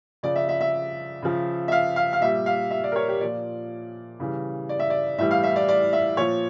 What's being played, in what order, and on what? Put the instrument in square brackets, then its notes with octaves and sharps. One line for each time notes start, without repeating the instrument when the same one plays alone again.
[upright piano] C#3 F3 D5
E5
E5
E5
C#3 F3
E5
F5
F5
F5
A#2 G3 E5
F5
E5
D5
A#4
C#5
G4
A#2 F3 D5
C#3 E3 G3
D5
E5
D5
A2 E3 G3 E5
F5
E5
D5
D5
E5
A#2 F3 C#5